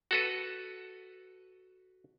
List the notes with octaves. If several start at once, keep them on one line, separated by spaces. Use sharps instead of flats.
F#4 A4 B4